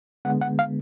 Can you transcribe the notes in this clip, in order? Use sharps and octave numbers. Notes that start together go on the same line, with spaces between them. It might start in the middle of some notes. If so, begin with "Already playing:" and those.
D3 G#3 B3 F#5
F#5
F5